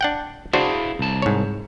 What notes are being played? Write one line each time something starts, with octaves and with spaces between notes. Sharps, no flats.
D4 F#5 G5
D4 E4 F#4 G#4 C5 F5
C2 A5
G#2 C#5